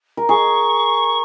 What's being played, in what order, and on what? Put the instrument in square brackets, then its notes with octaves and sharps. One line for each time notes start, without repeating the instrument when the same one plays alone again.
[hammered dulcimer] A#4
[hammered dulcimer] G#4 [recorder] C#6